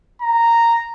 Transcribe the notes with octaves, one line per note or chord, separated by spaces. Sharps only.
A#5